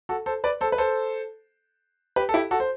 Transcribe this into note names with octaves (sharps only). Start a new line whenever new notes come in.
F#4 A4
A4 C5
B4 D5
A4 C5
B4
A4 C5
G4 B4
A4
E4 G4
F#4 A4
C5